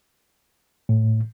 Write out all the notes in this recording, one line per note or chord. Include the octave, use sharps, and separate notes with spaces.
A2